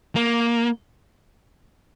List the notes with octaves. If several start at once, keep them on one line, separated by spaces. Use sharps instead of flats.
A#3